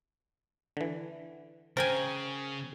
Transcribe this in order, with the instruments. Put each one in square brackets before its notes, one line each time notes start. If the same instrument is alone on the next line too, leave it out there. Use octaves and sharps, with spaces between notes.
[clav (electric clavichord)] D3 E3
[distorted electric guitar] C#3 [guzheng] A#4 G5 G#5 [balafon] C5